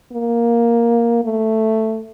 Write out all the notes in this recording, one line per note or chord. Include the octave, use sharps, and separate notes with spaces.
A#3
A3